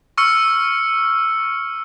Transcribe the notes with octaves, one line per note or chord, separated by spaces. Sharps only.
C#6 E6 F6 C#7